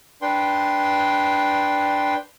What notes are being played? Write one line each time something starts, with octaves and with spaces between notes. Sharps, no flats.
D4 B4 G5 C6